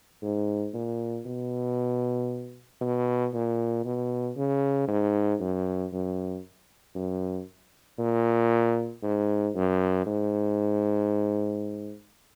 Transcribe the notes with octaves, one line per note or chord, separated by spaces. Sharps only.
G#2
A#2
B2
B2
A#2
B2
C#3
G#2
F#2
F#2
F#2
A#2
G#2
F#2
G#2